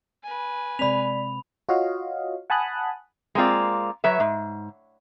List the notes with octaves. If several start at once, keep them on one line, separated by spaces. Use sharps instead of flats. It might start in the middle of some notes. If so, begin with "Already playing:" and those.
B4 G#5
C3 G#3 C4 D5 B5 B6 F7
F4 F#4 C#5 D#5 F5
F#5 G#5 A5 B5 D#6 F#6
G#3 A#3 C4 F4 D5
F#3 B4 C#5 E5
G#2